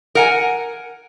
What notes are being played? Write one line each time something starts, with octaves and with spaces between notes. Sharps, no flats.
A#4 F#5 G#5